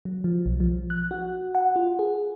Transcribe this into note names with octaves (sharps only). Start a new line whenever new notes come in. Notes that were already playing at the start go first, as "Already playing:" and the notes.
F#3
F3
B1
F3
F#6
F#4
F#5
F4
G#4